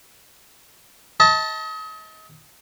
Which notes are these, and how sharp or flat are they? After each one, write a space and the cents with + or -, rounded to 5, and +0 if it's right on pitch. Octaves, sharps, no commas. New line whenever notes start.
D#5 +35 A5 +0